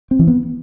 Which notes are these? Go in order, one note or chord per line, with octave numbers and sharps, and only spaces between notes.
C4
E3
B3